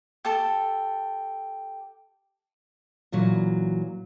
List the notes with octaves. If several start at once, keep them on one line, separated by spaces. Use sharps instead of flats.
G4 A4 A5
A#2 E3 F#3